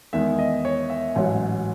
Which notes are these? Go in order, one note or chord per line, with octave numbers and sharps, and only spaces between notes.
E2 D#3 G#3 E5
D#5
C#5
E5
A1 G#2 F#3 C#4